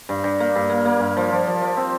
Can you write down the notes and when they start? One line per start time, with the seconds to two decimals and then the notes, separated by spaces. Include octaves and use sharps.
0.09 G2
0.24 G2
0.40 A#3
0.55 G2
0.70 A#3
0.85 A#3
1.00 G2
1.17 F3
1.31 F3
1.47 F3
1.62 F3
1.77 C4